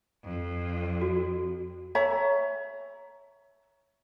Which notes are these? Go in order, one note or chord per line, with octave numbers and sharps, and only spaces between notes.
F2
F#4
C#5 E5 A#5